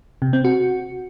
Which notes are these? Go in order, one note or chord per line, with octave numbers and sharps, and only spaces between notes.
C3
C4
F#4